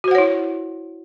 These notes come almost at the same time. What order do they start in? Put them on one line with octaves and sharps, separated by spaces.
F#4 C5 F#5 C#5 E4